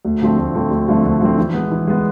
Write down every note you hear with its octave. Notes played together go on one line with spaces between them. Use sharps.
D2
D3 F3 A3 C4
D2
D3 F3 A3 C4
D2
D3 F3 A3 C4
D2
D3 F3 A3 C4
E3
G#3 B3
E3
G#3 B3